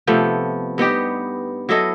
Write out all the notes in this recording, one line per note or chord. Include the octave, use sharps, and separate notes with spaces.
C3 F3 A3 B3
G2 B3 D#4 G4
F#3 E4 A4 D#5